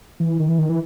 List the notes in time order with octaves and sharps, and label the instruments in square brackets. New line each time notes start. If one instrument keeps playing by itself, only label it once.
[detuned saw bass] E3
D#3
E3
D#3
E3